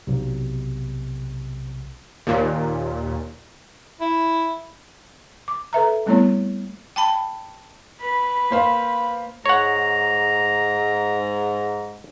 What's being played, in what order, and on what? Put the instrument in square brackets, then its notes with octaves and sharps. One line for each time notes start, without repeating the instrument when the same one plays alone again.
[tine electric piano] B1 C3
[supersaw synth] D#2 A#2
[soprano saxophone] E4
[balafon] D6
A4 B4 E5 A#5
G3 A3 B3 C4 E4 C#5
G5 A5 B5
[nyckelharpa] B4 B5
[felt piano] A#3 C5 F5
[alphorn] G#2 [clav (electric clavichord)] C#5 F#5 [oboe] A#5